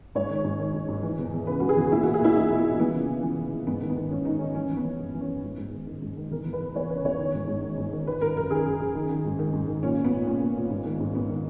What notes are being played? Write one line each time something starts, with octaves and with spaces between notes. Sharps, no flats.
G#2 C#5
D#3
G#2
D#3
G#2
G#2
E3
E2
E2
C#3 B4
E3 F#4
G#4
E2
A#2 E4
F#4
A#2
G#4
A#2 E4
A#2 D#4
A#2
B3
A#2
E3 B3
C#3
C#3
E3
E2
E3
G#2 B3
D#3
B3
D#3
G#2 C#4
D#3 D#4
D#3 C#4
E3 C#4
E3
B3
E3
F#2
E3
C#4
F#2
G#2
G#2
D#3
D#3
G#2
D#3
E2 A#4
E2
B4
E2
E3 C#5
C#3 B4
E2 C#5
D#3
G#2
G#2
D#3
G#2
D#3
D#3 B4
D#3 A#4
F#2 A#4
D#3 G#4
F#2
F#2
D#3
D#3
G#2
D#3
G#2
D#3
A#2 C#4
A#2
B3
A#2
A#2 C#4
A#2
A#2
G#2
D#3
G#2
G#2 B3
D#3